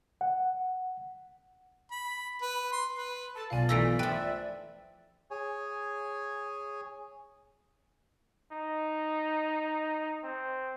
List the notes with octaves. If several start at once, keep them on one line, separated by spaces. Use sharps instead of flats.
F#5
B5
B4
C6
B4
A4 A5
B1 B2 F4 D5 F5 G#5
E3 A3 A#5 E6 B6 D7
F3 B4 E5 G5
G#4 C#5 G#5
D#4
C4